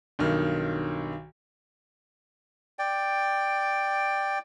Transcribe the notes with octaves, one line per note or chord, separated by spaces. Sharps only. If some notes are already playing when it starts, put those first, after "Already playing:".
B1 G2 D#3
D5 G5